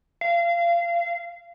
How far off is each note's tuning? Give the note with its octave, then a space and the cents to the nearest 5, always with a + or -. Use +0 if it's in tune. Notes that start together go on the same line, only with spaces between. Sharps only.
F5 -25